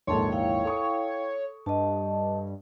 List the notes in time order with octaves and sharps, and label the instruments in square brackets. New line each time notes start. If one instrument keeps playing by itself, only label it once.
[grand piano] A#1 D#2 G#2 [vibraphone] A4 A5 C6 [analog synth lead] C#5
[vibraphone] E4 F5 G5
[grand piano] A4 C#6 D#6
[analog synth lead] G2 [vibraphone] D#5 A5